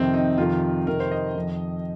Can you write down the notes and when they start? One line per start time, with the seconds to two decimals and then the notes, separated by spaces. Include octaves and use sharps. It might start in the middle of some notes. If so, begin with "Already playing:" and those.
Already playing: F2 C3 D#3 C4
0.14 D#4
0.38 F2 C3 D#3 F4
0.87 F2 C3 D#3 A#4
1.00 C5
1.12 D#5
1.35 F2 D#3